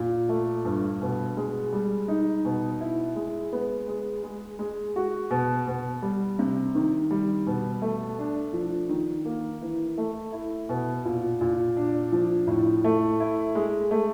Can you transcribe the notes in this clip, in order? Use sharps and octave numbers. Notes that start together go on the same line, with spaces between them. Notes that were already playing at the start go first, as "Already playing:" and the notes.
Already playing: A#2
A3
G2
B2
G#3
G3
D#4
B2
E4
G#3
B3
G#3
G#3
G#3
F#4
B2
B2
G3
C3
D#3
G3
B2
A3
D4
F3
D#3
A#3
E3
A3
E4
B2
A#2
A#2
D4
F3
A2
A3
E4
G#3
A3